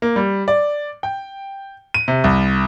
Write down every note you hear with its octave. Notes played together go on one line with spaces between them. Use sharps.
A#3
G3
D5
G5
D#7
C3
C2